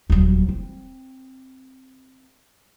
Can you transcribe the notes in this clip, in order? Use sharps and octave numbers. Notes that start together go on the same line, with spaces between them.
D#1 F#3
C4